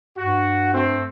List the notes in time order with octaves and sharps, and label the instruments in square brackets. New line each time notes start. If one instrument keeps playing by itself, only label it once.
[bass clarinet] G2 [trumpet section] F#4
[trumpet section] A3 C4